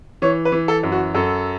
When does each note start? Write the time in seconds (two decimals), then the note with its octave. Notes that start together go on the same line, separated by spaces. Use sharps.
0.22 E3 C#5
0.45 B4
0.52 E3
0.68 A4
0.83 F#2
0.92 F#4
1.15 F#2 A4